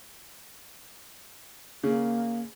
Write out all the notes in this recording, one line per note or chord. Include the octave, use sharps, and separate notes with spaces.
C#3 A#3